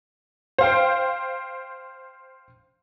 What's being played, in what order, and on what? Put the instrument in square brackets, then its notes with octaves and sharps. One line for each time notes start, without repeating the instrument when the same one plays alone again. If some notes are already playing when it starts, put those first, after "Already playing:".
[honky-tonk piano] C5 F5 G5